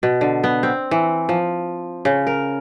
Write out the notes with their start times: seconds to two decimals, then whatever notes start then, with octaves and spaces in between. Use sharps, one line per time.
0.03 B2
0.21 D3
0.44 B3
0.63 C4
0.91 E3
1.29 F3
2.05 C#3
2.27 A#4